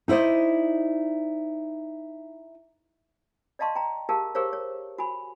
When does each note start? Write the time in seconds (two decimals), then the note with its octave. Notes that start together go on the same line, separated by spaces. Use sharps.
0.08 D#4 E4 C5 D5 D#5
3.59 D5 D#5 F5 A5 C6 C#6
3.76 G5 A#5
4.09 G4 G#4 A#4 F5 A5
4.35 G4 G#4 A#4 C5 C#5 F5
4.53 C#5
4.98 F#4 G#5 B5